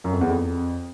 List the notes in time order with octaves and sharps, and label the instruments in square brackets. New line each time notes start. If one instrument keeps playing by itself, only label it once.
[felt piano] F#2
F2
E2
F2